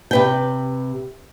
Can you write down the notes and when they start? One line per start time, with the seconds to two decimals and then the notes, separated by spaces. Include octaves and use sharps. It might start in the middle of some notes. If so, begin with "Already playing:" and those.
0.11 C3 B4 G5